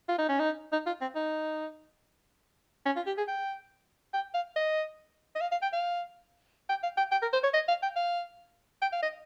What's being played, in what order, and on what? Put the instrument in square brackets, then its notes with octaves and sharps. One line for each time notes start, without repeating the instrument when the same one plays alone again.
[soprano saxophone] F4
D#4
C#4
D#4
D#4
F4
C4
D#4
C#4
F4
G4
G#4
G5
G5
F5
D#5
D#5
F5
F5
G5
F5
G5
F5
G5
G5
A#4
C5
C#5
D#5
F5
G5
F5
G5
F5
D#5